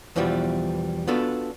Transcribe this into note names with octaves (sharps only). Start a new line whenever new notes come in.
E2 B2 E3 F3 G3
B3 D4 F4 F#4 A4